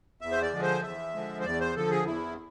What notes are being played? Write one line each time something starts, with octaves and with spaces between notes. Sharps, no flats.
E2 E5
C5
D5
D3 F3 G#3
C5
E2 E5
D3 F3 G#3
C5
E2 D5
C5
D3 F3 A4
G#4
E2 E4